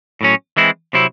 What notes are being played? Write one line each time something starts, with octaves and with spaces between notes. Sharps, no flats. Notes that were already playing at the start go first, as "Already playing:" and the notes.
A2 F#3 C#4
E3 G#3 C4 E4
C3 F#3 C4 E4